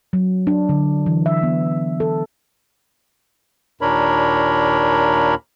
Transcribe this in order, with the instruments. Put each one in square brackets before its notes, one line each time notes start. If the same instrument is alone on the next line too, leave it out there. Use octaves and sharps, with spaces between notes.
[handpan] F#3
D4
D3
E3
E5
B3
A4
[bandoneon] D#2 A#2 D4 A#4 C#5 B5